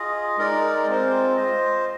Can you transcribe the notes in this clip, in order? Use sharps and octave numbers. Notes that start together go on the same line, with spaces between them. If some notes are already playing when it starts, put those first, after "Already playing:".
Already playing: F4 G#4 D#5
G#3 D#4 A#4 D5
G#3 C4 F4 C5
F4 C5 D#5